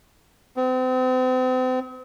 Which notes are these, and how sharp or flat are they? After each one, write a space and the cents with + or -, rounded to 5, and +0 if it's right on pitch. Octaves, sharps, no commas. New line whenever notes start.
C4 -40